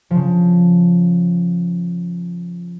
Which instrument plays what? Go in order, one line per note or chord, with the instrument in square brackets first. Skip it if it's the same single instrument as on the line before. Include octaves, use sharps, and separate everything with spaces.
[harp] C#3 F3